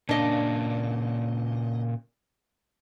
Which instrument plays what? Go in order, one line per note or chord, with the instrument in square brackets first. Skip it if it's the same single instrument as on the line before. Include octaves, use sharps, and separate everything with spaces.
[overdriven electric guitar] A#2 C#3 [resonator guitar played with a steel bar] D4 D#5